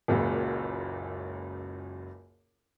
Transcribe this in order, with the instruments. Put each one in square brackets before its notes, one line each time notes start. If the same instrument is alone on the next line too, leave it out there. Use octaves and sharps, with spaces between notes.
[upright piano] F#1 C#2 F#2 A#2 C#3